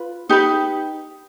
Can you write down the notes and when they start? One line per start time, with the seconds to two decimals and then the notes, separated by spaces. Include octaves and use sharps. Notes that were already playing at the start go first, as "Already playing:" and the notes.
Already playing: F4 B4
0.29 D#4 G4 B4